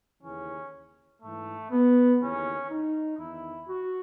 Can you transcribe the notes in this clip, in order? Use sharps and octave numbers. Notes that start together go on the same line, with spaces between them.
D#2 C#3 E3 C#4
G#2 E3 A3
B3
D#2 C#3 E3 C#4
D#4
E2 D#3 E4
F#4